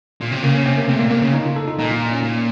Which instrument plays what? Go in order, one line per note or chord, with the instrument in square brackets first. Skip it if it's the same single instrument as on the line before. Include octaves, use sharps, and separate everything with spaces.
[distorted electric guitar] A#2
C3
[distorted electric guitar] C#3 [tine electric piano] A#3
[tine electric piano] C#4
[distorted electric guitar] C3 [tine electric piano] C#4
[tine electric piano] A#3
[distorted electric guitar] C3 [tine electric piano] A3
[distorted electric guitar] A#2 [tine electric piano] A#3
[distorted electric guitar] C3 [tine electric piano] A#3
[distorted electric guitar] C#3 [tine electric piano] C#4
[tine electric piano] D#4
F4
A4
D#4
[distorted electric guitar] A#2 [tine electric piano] D#4
[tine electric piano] F4
D#4
C#4
[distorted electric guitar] A#2